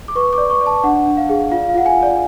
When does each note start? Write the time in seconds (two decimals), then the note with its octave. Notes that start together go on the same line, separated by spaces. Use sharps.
0.08 D6
0.15 B4 C#6
0.33 D6
0.38 D5
0.50 C#6
0.61 D5
0.66 A5
0.84 D4 F#5
1.06 D4
1.17 F5
1.29 G#4
1.52 F4 F5
1.69 F5
1.74 F4 F#5
1.86 G#5
1.97 F4
2.03 D5